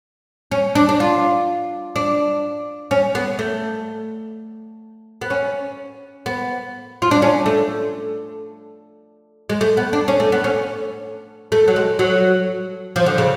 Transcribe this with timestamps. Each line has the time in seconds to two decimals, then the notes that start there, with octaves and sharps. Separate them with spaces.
0.51 C#4
0.75 D4
0.89 D4
1.00 F4
1.96 D4
2.91 C#4
3.15 B3
3.39 A3
5.21 B3
5.30 C#4
6.26 B3
7.02 F4
7.11 D4
7.22 C#4
7.46 A3
9.49 G#3
9.61 A3
9.77 B3
9.93 D4
10.08 C#4
10.20 A3
10.32 B3
10.44 C#4
11.52 A3
11.68 F#3
11.76 G#3
11.99 F#3
12.96 F3
13.06 D3
13.18 C#3